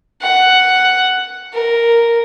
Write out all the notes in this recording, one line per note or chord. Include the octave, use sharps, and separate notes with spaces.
F#5
A#4